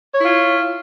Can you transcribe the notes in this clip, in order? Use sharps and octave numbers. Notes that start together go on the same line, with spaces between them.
E4 F4 C#5